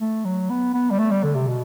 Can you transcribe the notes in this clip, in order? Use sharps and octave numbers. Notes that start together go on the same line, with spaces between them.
A3
F#3
B3
B3
G3
A3
G3
D3
C3
B2